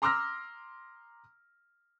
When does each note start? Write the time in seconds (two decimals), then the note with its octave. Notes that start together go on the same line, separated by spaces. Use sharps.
0.02 A#5 C6 D6 E6 F6 A#6